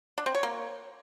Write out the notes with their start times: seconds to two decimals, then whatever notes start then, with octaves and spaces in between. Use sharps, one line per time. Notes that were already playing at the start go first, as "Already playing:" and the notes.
0.18 D4
0.26 C4
0.35 C#5
0.43 A#3